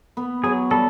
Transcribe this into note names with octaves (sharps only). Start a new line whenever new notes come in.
B3
F#3 G#4
G3 A4